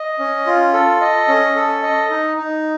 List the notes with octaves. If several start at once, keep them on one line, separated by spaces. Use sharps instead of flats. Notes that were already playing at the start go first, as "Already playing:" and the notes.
Already playing: D#5
C#4
F4
A4
D#5
C#4
A4
D#5
D#4
D#4